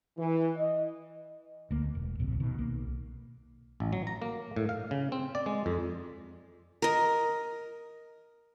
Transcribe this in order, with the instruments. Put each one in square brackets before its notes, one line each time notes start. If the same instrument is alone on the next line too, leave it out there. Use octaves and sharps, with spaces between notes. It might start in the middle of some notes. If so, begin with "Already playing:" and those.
[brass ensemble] E3
D#5
[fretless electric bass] D2 A#3
E1
D1 A#1 C3
B2 D#3
B1 A#3
[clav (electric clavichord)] A1
F#3
A#5
A#3
A2
F5
C#3
C4
D5
G#3
F2
[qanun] A#4 D#5